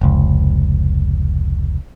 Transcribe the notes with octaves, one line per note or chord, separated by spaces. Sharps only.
F1 C#2